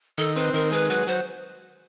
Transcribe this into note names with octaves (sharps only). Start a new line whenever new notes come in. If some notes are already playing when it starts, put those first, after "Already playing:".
D#3 A4
C4 B4
D#3 A#4
G#3 B4
F#3 B4
F#3 C5